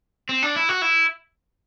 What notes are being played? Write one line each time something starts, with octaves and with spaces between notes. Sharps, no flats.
C4
D4
E4
F#4
E4